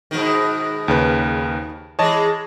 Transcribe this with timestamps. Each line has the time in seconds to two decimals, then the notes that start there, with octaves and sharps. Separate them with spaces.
0.11 G#2 B2 D#3
0.88 D#2 C#3 B4
1.99 E3 G#3 C#5 D#5 A5